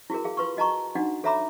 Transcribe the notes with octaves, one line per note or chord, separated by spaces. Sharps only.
E4 F#4 G#4 A#4
G#4 F5
F4 B4 C6 C#6
F#4 D#5 A5 A#5 C#6
D4 D#4 F#4 F#5
A4 C#5 E5 A#5 B5 D6